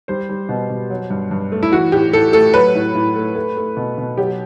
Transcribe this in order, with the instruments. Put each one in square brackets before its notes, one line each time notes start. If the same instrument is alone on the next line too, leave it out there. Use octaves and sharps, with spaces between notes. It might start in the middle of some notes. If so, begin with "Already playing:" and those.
[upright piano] G3 C5
G3
B2
B2
F#3
G2
G2
A3
E4
E3 F#4
A2 G4
A2 A4
A3 A4
F#3 B4
A2
A2
A3
A3
A3
B2
B2
F#3 G4